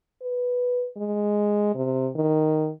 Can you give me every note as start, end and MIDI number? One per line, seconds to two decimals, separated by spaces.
0.22 0.86 71
0.97 1.70 56
1.75 2.10 48
2.16 2.70 51